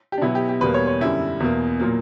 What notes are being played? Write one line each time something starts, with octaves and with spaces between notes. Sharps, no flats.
G4
D4
B2 F#3 B3 E4
G4
G4
E2 B2 G3 A#3 B4
C#5
C#5
F#2 D3 G3 E4
E2 B2 A#3
A#2 F#3 A#3